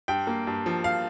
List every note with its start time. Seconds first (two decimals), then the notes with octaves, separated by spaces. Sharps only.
0.08 G2 G5
0.27 A#3
0.47 G2
0.66 F3
0.84 F5